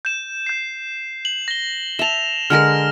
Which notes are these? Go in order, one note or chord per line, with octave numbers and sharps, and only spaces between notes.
G6 E7
G6 C7
F#7
A#6 G7
E5 A5 E7 F7
D3 G#3 A#4 F6 A#6